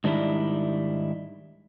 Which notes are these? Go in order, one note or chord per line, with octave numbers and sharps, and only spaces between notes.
G#2 D#3 G3 D4 E4